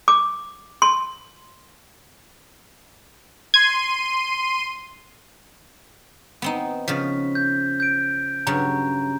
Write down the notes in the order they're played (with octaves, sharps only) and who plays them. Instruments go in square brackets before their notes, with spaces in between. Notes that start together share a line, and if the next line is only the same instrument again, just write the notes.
[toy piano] D6
C6
[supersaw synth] C6 D#7 [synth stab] G#6
[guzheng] B3 C4 D#4
[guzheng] C#3 F3 [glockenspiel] B6
[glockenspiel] G6
G6 D7
[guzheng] G2 C#3 F#3 [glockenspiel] A#5